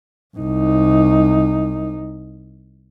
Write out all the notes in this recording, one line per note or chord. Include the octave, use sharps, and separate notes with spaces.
C2 D#4